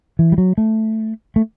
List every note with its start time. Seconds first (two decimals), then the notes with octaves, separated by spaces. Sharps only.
0.19 E3
0.32 G3
0.38 F#3
0.58 A3
1.36 A3